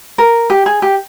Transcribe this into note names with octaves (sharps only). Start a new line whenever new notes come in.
A#4
G4
G#4
G4